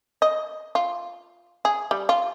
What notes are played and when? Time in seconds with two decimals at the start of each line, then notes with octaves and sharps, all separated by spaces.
0.22 D#5
0.75 F4
1.65 G#4
1.91 G3
2.09 F4